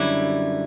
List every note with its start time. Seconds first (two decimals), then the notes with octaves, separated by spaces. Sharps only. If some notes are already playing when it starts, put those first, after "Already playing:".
Already playing: F#2 D3 G3 E4